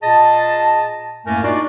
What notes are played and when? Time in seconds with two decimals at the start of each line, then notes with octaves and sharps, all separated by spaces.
0.03 A#2 G#4 D#5 A5
1.27 F#2 A2 A3 A#3 A#4 G#5
1.44 D4 D#4 F4 F#4 D5